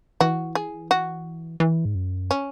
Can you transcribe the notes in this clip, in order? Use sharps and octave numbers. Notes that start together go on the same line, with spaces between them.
E3 F#4
G#4
F#4
E3
G#2
F#2
C#4